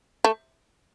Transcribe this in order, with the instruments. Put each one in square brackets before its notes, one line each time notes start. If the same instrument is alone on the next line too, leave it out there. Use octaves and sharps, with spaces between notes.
[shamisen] A3